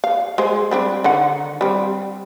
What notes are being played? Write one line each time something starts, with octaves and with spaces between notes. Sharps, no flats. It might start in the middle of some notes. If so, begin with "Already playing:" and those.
F5
G#3 G#4 C5
G3 C4 D4
D3 D#3 F#5
G3 C4